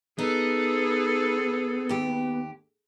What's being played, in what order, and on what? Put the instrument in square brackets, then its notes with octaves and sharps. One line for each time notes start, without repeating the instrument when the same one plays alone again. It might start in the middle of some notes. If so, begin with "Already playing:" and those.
[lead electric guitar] B3 [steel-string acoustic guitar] D#4 [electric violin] G#4 A4
[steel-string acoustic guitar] D#2 G4